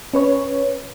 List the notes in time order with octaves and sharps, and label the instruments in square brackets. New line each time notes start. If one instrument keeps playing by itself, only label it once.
[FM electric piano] C#4 B4 C#5